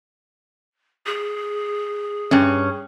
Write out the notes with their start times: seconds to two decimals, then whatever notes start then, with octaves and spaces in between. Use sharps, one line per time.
1.06 G#4
2.31 G2 C#4